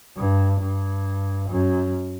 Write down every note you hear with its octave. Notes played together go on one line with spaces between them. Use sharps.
G2
G2
F#2